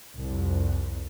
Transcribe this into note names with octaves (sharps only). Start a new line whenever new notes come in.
C2 F2